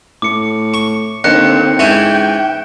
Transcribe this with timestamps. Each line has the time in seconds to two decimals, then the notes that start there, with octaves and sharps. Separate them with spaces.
0.22 A2 D6 C#7
0.74 C#6
1.24 D#2 D3 C4 F#6 C#7
1.79 G#2 E3 C#4 G5